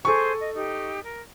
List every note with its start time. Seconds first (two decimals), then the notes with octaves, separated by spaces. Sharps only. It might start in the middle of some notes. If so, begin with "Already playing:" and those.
0.05 G#4 A4 C5 G#5 C#6
0.38 D#5
0.55 D#4 G4
1.03 A#4